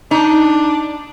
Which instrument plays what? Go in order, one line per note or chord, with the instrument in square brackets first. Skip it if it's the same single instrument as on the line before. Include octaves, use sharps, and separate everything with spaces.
[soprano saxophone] D4 [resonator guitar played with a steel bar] D#4